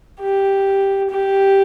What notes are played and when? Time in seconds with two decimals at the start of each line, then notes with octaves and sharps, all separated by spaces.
0.21 G4
1.10 G4